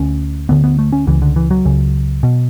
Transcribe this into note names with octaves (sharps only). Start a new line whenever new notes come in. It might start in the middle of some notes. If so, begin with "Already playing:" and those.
Already playing: D2 D3 C#4
D2 D3 B3
B3
A3
C#4
C#2 C#3 E3
D3
E3
F#3
C#2 C#3
B2